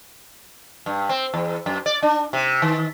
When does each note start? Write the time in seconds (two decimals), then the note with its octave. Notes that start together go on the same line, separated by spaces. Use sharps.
0.86 G2
1.09 C4
1.34 E2
1.66 F#2
1.86 D5
2.02 D4
2.33 C3
2.62 D#3